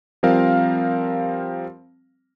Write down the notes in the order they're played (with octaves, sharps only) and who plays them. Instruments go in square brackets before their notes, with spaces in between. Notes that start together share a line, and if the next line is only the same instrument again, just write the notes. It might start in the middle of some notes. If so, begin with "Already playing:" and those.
[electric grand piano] F3 G3 C4 A#4 F5